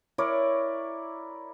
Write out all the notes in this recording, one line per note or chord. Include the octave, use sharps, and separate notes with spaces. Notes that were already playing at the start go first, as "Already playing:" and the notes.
E4 A#4 C#5 D5